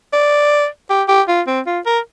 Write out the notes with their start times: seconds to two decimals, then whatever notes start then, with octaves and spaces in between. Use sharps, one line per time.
0.13 D5
0.90 G4
1.08 G4
1.28 F4
1.47 C4
1.67 F4
1.86 A#4